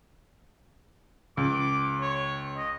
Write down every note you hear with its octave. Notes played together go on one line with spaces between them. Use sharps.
C#2 D6
C#5
D#5